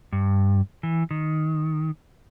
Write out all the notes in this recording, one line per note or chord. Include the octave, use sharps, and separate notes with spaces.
G2
E3
D#3